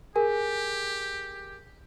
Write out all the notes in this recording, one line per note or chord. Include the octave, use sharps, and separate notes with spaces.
G4 G#4 A#4 G#5